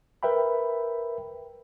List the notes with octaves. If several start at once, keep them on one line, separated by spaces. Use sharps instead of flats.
A#4 B4 E5 G5 B5